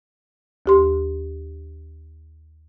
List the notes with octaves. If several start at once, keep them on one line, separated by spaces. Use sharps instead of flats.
D#2 G4 C6